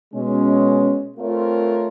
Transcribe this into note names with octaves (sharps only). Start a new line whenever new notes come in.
B2 G#3 C#4
A3 C4 F4 A#4 C#5